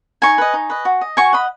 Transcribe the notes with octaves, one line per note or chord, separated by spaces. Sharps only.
D#4 G#5 C#6
B4 D#5
D#4
B4 D#5
F#4
D#5
F#4 G#5 C#6
D#5 F#5 B5